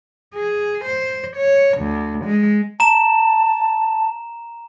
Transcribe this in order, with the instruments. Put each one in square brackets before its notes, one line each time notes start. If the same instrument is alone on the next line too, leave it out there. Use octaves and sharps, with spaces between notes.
[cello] G#4
C5
C#5
D2
G#3
[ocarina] A5 [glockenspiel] A#5 E7